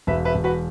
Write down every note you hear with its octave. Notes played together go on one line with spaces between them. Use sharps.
E1 B4 E5
B4 E5
E1
F#4 B4